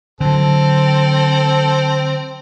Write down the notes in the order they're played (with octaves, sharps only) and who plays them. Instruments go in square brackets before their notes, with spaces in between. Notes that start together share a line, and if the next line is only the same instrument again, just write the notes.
[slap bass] D3 F#3 [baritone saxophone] C4 [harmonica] A4